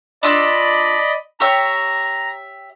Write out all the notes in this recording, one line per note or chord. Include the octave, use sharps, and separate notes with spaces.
D4 F4 D5 D#5 B5 E6
G4 C#5 E5 A#5